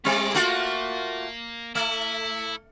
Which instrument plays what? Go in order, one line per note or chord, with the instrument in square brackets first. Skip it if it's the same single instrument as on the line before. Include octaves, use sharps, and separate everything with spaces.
[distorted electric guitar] A2 D5 [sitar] G3 C4
[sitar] A3 F4 F#4 [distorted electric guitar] A#3
[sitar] A3 [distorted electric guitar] E4